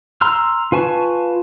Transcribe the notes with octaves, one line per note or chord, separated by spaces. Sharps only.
A#5 C6 E6 F6
F4 B4 G#5 A5 C#6